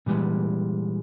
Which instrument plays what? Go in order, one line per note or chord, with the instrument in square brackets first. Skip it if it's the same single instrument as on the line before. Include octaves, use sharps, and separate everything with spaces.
[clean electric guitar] A#2 E3 G3 G#3